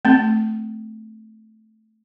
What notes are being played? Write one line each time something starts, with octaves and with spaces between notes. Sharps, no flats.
A3 C4